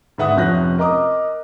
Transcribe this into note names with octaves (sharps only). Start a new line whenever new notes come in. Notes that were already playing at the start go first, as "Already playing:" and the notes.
G#2 D3 B4 E5 F#5 D#6
F1 C3 F3 C#4 F#6 A#6
A#4 D#5 A#5 D6 D#6